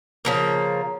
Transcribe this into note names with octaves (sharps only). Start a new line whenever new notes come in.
C#3 F3 A#3